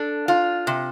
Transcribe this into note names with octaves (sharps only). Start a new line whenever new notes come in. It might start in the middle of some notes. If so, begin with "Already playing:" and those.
Already playing: D4 A4
F4
C3